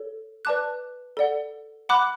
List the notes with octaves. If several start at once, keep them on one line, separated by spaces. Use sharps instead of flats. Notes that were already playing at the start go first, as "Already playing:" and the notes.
Already playing: A4 C#5
B4 D5 A5 D6 F#6
A4 D5 F#5
F#5 B5 D6 F#6